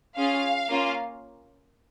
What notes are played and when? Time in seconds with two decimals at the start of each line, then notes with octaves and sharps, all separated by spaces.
0.17 C#4 F4 G#4 F5
0.69 A#3 C#4 F4